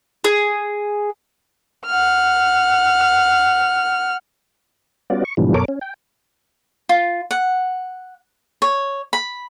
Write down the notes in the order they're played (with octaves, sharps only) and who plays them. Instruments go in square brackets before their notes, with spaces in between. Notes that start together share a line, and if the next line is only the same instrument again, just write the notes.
[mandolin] G#4
[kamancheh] F#5 F6
[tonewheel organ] G3 B3 C#4 F4 F#4 D5
C#6
G#2 B2 D3 E3 F3 G3
F#2 B2 A4 A#4 C#5 D6
C#4
G5
[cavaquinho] F4
F#5
C#5
B5